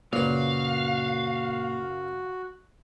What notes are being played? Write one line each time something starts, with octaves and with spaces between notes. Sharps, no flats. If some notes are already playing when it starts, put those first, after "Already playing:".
F#2 A#2 C#3 F#4 B4 F5